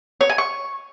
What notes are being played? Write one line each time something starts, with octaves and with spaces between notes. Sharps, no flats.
C#5
G#5
C#6